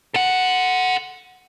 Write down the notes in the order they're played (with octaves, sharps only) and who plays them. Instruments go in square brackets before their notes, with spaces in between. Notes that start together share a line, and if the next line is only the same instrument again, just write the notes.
[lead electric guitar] A4 F#5